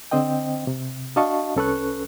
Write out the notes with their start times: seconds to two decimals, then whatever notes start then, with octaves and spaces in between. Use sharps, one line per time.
0.11 D3 C4 C5 D#5 G5
0.67 C3
1.16 D4 F#4 D#5 F5 A5 C#6
1.56 C2 C#4 A4 B4 C#6 F#6